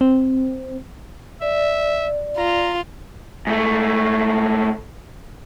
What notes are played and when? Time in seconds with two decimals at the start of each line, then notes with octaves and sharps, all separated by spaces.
0.01 C4
1.42 D5 E5
2.38 F4 A#5
3.47 G#2 A3